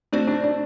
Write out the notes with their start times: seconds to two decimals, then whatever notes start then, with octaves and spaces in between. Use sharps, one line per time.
0.12 A3 C4 D4 F#4 C5
0.27 D4
0.44 D4